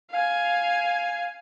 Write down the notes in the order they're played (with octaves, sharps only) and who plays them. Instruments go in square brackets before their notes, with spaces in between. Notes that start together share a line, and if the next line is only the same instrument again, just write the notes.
[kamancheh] F5 G#5